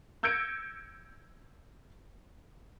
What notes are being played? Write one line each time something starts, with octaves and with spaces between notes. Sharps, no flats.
E6 G6 G#6 A#6 C#7 D7